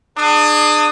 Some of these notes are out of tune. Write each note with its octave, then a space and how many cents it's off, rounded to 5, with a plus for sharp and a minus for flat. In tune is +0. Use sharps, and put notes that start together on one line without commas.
D4 +35 G#4 +0 D#6 +0